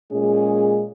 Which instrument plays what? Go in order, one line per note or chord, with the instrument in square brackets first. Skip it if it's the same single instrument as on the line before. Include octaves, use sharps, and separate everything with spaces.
[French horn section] A#2 G#3 C#4 G#4